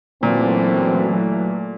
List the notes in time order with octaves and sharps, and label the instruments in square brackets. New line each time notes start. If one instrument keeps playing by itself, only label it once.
[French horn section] F#2 D3 C4 [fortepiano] A#2 [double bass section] E3 F#3 A3